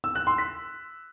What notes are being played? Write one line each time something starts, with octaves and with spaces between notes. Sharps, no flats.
E6
F#6
C6
B6